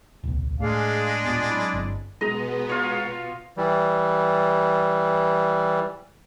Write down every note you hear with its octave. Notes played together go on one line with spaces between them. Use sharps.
D1 B1
A2 G#3 D4 G#4 F5
D#2 A#2 B3
F#3 C4 E4
G1
B2 G#3 B3 D#5 A#5
F4 C#5
E3 G3